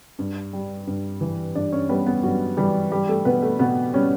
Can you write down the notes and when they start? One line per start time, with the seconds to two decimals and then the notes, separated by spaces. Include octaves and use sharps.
0.19 G2
0.53 G3
0.87 G2
1.21 E3
1.55 G2 D4 D5
1.72 C#4 C#5
1.89 G3 B3 B4
2.06 B3 B4
2.23 G2 F#3 F#4
2.57 E3 G3 G4
2.91 G3 G4
3.09 A3 A4
3.25 B2 B3 B4
3.42 A3 A4
3.59 B2 B3 B4
3.93 G3 C#4 C#5